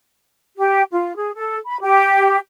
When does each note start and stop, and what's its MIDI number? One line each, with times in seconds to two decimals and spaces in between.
0.57 0.82 67
0.91 1.15 65
1.16 1.31 68
1.35 1.56 69
1.67 1.79 83
1.81 2.37 67